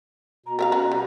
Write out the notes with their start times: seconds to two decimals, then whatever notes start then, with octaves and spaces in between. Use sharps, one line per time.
0.46 B2 A#5
0.59 A#4 E5 F5 A#5
0.72 C#4 F#4 B4
0.92 G3